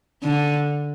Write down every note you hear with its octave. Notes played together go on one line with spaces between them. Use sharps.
D3